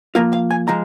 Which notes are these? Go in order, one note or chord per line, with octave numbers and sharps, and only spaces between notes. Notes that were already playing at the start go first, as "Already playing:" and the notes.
F3 A#3 F4 A#4
F5
G#5
F3 G#3 A#5